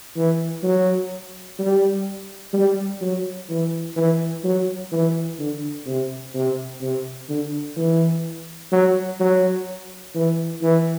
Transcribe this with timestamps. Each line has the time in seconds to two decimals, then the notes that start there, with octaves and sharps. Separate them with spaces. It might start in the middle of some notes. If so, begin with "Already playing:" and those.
0.16 E3
0.63 F#3
1.59 G3
2.53 G3
3.01 F#3
3.49 E3
3.96 E3
4.44 F#3
4.92 E3
5.39 D3
5.87 C3
6.34 C3
6.81 C3
7.29 D3
7.76 E3
8.72 F#3
9.20 F#3
10.15 E3
10.62 E3